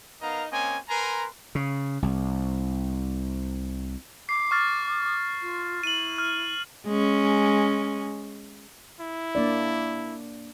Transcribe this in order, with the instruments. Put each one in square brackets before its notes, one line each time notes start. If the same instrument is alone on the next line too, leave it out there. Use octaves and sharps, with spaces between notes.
[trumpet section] B3 D#4 A#4 D#5 F5 A#5
A#3 C4 C#4 D#5 G#5
A#4 B4 G#5 A#5 C6
[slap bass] C#3
C2
[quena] D6 [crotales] C7
[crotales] C#6 F6 A6
[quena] F4
[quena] E4 [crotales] D#7 F#7
[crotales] F6
[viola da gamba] G#3 C#4
[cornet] E4
[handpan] A#3 D4 D5